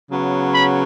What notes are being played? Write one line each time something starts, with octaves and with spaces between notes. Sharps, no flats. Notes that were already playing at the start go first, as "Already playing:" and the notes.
C#3 F#3 B3
B5